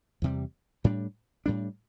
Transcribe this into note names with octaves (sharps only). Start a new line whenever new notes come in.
E2 C3 G3
A2 G3 D4
A2 G3 D4